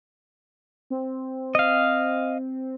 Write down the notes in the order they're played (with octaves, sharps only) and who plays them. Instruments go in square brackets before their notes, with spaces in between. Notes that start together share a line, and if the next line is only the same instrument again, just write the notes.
[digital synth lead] C4
[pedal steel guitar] D#5 F5